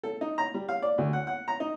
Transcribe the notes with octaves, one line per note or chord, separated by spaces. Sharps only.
A4
D#4
A#5
G3
F5
D5
D2
F#5
F#5
A#5
D#4